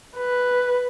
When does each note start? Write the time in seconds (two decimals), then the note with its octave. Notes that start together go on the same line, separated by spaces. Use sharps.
0.16 B4